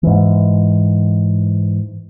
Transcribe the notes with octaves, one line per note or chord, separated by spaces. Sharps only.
G#2 E3